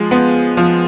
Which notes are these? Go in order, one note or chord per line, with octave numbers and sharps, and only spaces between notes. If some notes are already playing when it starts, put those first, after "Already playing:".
Already playing: F3 G#3
B3
F3